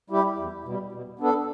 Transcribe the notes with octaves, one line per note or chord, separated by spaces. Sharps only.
G3 E4 G4
E2
B2 G3
B2
B3 D4 A4